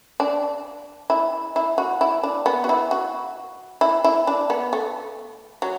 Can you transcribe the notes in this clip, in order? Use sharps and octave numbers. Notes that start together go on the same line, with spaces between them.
D4
E4
E4
F#4
E4
D4
B3
F#4
E4
F#4
E4
E4
D4
B3
A3
F#3